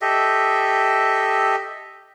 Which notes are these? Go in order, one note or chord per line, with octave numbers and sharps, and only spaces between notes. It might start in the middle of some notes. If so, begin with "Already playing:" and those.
G4 A4 D#5 E5